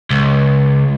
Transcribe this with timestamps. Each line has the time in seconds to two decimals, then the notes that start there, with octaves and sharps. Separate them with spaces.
0.10 C#2